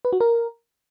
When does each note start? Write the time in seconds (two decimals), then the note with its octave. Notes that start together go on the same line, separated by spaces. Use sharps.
0.05 B4
0.13 F#4
0.20 A#4